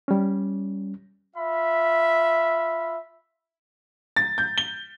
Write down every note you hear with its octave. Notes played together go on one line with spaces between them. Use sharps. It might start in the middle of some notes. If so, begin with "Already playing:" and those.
G3 C#4
F4 E5 B5
A6
G6
G7